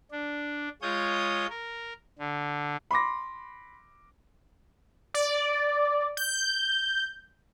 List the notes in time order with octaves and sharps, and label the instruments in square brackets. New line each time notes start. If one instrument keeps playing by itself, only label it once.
[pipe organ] D4
G#3 F4 C#5 D#6 G6
A#4
D3
[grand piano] B5 C6 D6 A#6
[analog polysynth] D5
G6